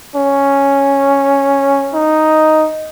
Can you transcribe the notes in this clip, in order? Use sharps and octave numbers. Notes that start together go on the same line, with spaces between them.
C#4
D#4